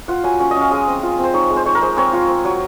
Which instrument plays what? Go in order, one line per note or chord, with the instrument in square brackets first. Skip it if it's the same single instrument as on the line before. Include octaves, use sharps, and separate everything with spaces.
[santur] F4 F#5
F#3 G#5
C#4 F#5
D#5
C#4 F5
G#3 D#5
C4
F4
C4 C5
D#4 C#5
G#3
C5
G#3 C#5
A#4
G#3 C5
C4 C#5
F4
C4
F#3